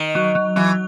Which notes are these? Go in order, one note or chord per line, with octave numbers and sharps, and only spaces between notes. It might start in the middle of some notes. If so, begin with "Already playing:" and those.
Already playing: D#3
F#3
F#3
E3 F#3